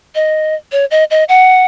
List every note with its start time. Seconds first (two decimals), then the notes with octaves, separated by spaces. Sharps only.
0.15 D#5
0.72 C#5
0.91 D#5
1.11 D#5
1.29 F#5